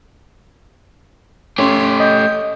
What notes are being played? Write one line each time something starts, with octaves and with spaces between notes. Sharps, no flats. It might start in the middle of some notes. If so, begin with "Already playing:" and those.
A3 C#4 G4 C6
D#5 G6